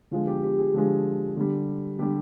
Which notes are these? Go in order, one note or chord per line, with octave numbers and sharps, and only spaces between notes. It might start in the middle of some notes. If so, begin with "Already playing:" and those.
D3 F3 G#3 F4
G4
G4
G#4
D3 F3 G#3
D3 G3
D3 G3 G4